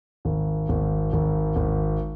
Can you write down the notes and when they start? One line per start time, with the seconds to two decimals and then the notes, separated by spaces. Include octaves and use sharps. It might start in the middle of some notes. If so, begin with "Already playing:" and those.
0.25 G#1
0.69 G#1
1.13 G#1
1.56 G#1